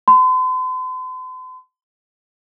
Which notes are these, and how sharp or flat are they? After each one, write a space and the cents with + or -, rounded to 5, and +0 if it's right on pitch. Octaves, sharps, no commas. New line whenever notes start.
C6 -45